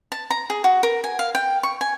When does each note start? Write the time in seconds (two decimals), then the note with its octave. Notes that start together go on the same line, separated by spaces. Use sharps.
0.12 A5
0.30 A#5
0.50 G#4
0.64 F#4
0.83 A#4
1.04 G#5
1.19 F5
1.35 G5
1.63 C#6
1.81 G#5